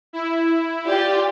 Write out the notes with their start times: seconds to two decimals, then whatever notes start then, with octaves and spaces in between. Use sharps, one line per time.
0.13 E4
0.87 F4 G4 D5